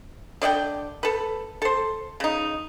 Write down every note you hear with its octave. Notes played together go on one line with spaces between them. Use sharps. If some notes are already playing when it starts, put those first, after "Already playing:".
D3 D5 D#5 G5
A4 B4
A4 C5
C#3 D#4